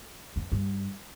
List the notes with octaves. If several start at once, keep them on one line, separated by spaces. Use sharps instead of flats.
F2
G2